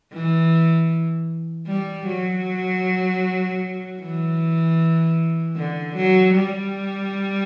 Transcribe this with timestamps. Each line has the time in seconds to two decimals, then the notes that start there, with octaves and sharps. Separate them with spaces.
0.13 E3
1.67 G3
2.07 F#3
4.01 E3
5.57 D3
5.96 F#3
6.34 G3